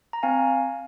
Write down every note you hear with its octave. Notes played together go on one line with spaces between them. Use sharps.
A#5
C4 F5 G#5